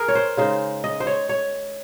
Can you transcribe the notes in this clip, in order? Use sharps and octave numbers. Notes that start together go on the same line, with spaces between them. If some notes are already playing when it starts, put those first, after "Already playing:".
Already playing: G#4 A#4
C#5
C5
C#3 G#3 D#4 C5
D#5
C5
C#5
C#5